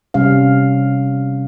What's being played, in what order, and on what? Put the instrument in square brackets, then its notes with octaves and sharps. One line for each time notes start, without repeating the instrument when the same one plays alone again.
[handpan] C3 G3 C#4 F5